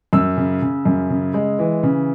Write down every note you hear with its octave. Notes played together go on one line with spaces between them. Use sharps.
F#2 E6
C#3
C#3
F#2
C#3
G#3
E3
C#3